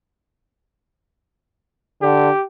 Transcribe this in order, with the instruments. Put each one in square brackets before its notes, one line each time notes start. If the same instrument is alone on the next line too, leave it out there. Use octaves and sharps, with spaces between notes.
[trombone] D3 [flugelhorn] G4